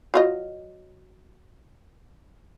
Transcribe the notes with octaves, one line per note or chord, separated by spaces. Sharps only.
F#3 F4 D#5